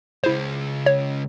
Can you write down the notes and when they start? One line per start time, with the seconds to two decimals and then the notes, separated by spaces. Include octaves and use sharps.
0.24 C#3 G#3 E4 C5
0.86 C#5